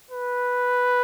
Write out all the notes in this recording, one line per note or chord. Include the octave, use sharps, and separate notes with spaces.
B4